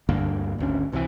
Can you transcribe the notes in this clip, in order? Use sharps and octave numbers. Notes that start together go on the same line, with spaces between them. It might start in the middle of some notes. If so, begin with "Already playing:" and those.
D2 G2 D3 A#3
G#1 D2 C#4
C2 C3 D#3 E3